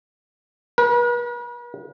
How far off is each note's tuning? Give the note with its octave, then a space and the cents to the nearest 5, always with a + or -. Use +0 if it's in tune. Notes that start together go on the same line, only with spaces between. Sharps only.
B4 -45